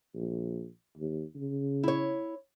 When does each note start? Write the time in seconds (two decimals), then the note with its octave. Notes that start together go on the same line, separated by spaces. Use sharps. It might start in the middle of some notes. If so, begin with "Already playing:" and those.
0.15 A#1
0.98 D#2
1.35 C#3
1.83 E4 C#5